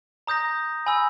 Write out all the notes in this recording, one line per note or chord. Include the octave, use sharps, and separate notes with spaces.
A#5 D#6 G6 A#6
G#5 B5 E6